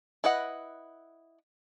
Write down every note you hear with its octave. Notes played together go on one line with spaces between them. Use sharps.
E4 B4 D#5 F#5